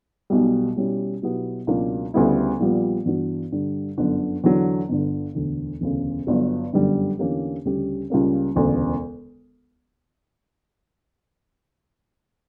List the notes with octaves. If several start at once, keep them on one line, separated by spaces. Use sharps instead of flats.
B1 B2 G3
B2 G3 C#4 E4 G4
B2 F#3 B3 E4 G4
C#2 B2 F#3 A#3 D4
D2 C#3 G3 B3 E4
A#1 A#2 G3 B3
G2 E3 B3 D4 F#4
G2 D3 G3
G1 F#2 D3
E2 D3 F#3
G1 G2 D3
E1 D2 D3
E1 D2 C#3
G1 G2 F#3
G1 F#2 D3 G3
E2 D3 A#3 C#4 G4
D2 C#3 G3 C#4 G4
C#2 C#3 G3 A#3 C#4
E1 D2 C#3